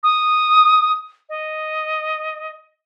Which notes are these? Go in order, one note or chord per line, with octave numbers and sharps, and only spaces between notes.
D#6
D#5